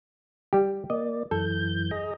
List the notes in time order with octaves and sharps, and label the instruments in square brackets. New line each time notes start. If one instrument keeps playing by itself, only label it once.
[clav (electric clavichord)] G3 G4
[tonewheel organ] A#3 D5 [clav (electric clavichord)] D#5
[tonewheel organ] F#2 E3 G6 [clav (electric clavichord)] A4
[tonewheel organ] G#4 D#5 A#5